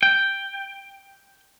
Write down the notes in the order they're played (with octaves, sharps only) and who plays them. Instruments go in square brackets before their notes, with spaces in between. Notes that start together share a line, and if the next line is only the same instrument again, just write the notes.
[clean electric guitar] G5